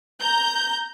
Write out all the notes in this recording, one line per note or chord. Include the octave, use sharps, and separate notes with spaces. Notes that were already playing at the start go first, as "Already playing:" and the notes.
A#5 G6